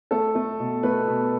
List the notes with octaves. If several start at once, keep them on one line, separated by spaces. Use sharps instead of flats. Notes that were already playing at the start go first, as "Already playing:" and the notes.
A3 A4
A3
B2
A3 B4
B2